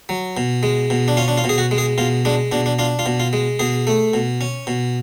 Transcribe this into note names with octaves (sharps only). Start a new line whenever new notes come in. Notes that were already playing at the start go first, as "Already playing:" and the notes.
F#3
B2
G#3
B2
D4
C#4 F4
D4
F4
B2
G#4
F#4
G#3
G#4
B2 F4
G#3 D4
B2 D4
D4
D4 F4
F4
B2
F4
G#3
B2 G#4
A3
B2
C#4
B2